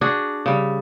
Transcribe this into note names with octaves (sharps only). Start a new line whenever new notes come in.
D4 F#4 G#4
C#3 G3